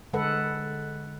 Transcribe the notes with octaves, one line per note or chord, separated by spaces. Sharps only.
D3 G#3 A4 B4 F#5